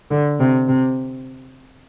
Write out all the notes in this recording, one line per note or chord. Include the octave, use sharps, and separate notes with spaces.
D3
C3
C3